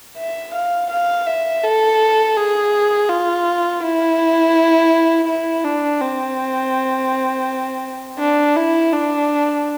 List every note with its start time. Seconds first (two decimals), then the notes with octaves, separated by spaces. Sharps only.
0.17 E5
0.54 F5
0.90 F5
1.27 E5
1.64 A4
2.37 G#4
3.09 F4
3.83 E4
5.28 E4
5.64 D4
6.01 C4
8.19 D4
8.56 E4
8.93 D4